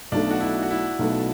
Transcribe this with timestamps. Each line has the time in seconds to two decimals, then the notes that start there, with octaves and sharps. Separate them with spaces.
0.12 B1 B2 A3 D4
0.30 F#4
0.41 E4
0.62 F#4
0.71 E4
0.99 B1 B2 A3